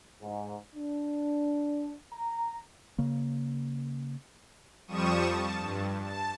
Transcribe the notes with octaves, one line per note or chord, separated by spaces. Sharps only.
G#2
D4
A#5
C#3 A#3
F2 F3 G3 C#6 D#6 E7
A5
G2
A5